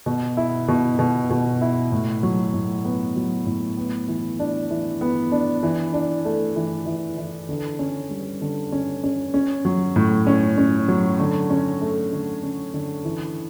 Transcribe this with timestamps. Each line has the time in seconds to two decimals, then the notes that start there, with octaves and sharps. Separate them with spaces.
0.06 B2
0.37 E4
0.68 B2
0.99 B2
1.30 B2
1.61 E4
1.92 A2
2.23 F#3
2.54 A2
2.85 B3
3.16 F#3
3.46 A2
3.77 B3
4.08 E3
4.39 D4
4.70 E3
5.01 B3
5.32 D4
5.63 E3
5.93 D4
6.25 A3
6.56 E3
6.86 E3
7.18 E3
7.49 D3
7.79 C#4
8.10 G3
8.41 D3
8.72 C#4
9.03 C#4
9.34 C#4
9.65 F#3
9.96 A2
10.27 C#4
10.58 C#4
10.88 F#3
11.19 D3
11.50 C#4
11.81 A3
12.12 D3
12.43 C#4
12.74 D3
13.05 E3